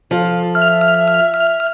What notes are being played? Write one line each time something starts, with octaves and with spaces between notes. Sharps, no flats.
F3 F4 A4
E5 F6